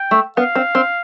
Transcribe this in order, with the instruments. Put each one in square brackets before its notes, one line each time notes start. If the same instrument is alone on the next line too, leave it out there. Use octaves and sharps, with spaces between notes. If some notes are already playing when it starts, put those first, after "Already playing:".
Already playing: [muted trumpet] G5
[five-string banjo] A3
[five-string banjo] B3 [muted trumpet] F5
[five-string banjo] C4
C4